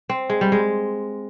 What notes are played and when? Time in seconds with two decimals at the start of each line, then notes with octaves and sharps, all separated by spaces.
0.09 C4
0.30 G#3
0.41 G3
0.52 G#3